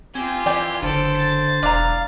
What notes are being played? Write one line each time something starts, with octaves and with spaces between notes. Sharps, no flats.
C4 F4 G4 G#5
E3 D5 G5
F#1 D3 A4 C5 D7
A6
E1 D4 F5 A#5